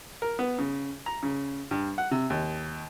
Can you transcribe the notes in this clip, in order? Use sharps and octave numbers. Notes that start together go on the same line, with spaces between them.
A#4
B3
C#3
A#5
C#3
G2
F#5
C3
D#2